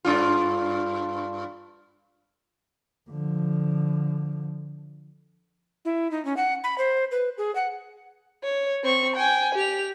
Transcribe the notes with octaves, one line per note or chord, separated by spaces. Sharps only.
G2 D4 F4
D3 F3
E4
D#4
C#4
F#5
B5
C5
B4
G#4
F#5
C#5
C4 C#6
G5 G#5
G4 F7